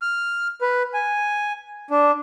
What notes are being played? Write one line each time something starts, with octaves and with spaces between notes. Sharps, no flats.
F6
B4
G#5
D4